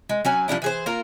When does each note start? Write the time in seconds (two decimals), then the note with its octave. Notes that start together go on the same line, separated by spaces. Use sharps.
0.09 G#3
0.25 F#3 C#4 G#5
0.48 F3 G3 D4 E4
0.62 E3 G#4 C5
0.86 A#3 F4 A#4